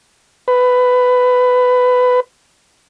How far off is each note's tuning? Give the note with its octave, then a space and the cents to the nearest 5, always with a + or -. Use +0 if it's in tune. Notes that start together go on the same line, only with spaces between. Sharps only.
B4 +15